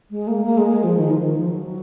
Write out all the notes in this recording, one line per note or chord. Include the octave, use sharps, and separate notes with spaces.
G#3
A#3
A#3
G#3
G#3
F3
D#3
F3
D#3
F3
F#3